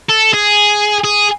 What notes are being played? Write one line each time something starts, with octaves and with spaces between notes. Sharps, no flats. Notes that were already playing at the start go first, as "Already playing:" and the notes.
A4
G#4
G#4